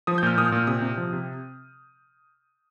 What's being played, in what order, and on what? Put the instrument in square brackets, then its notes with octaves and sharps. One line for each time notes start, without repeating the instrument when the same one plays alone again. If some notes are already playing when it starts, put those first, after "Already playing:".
[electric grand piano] F3 D#6
G6
A#2 F6
A#2 D#6
F6
A#2
C3 D#6
C3
F3
C3